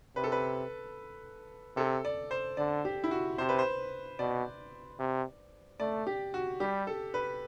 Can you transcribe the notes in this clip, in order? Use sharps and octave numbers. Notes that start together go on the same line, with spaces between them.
C3 B4
A4
B4
C3 A4
D5
C5
D3 D5
G4
E4
F#4
C3 C5
B4
C5
B2 D5
C3
A3 D5
G4
F#4
G3 G4
A4
B4